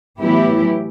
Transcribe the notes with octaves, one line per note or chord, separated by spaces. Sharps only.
A2 E3 F#3 B3 E4 G4